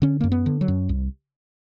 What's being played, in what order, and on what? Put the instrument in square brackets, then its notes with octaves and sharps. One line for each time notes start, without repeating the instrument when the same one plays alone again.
[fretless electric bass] D3 C#4
F#2 A#3
B3
D3
F#3
F#2
C2